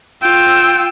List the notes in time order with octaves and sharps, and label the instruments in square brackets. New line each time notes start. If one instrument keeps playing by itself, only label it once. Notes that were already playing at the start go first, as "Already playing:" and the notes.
[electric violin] F4 E6 [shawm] G5